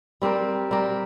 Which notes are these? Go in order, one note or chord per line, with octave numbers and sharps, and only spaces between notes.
G3 C4 G4 A#4
G3 C4 G4 A#4